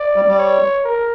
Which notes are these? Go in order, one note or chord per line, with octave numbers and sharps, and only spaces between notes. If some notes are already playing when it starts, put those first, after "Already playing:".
Already playing: D5
G3
G3
C#5
A#4